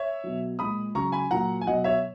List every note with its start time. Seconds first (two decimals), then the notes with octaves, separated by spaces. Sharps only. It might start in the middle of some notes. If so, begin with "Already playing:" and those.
Already playing: C#5 E5
0.24 B2 F#3
0.59 A#2 G#3 B5 D#6
0.95 C#3 F#3 A#5 C#6
1.12 G#5 B5
1.31 A#2 F#3 F#5 A#5
1.61 G#5
1.67 B2 F#3 D#5 F#5
1.84 C#5 E5